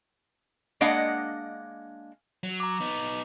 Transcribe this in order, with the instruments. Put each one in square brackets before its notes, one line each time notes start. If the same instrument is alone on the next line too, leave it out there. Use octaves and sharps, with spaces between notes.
[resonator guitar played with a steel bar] G#3 A#3 D4 D#5 F5 F#5
[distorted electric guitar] F#3
[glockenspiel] A#5 D6
[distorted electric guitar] B3 D#4